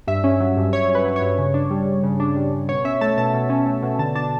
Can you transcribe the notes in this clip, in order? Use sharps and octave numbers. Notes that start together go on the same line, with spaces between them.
G2 E5
C#4
F#3
G2
G2 C#5
C#4
B4
F#3
C#5
G2
C#3
D4
G3
C#3
C#3
D4
G3
C#3
B2 C#5
C#4 E5
A3 A5
B2 A5
B2
C#4
A3
B2
D3 A5
D4 A5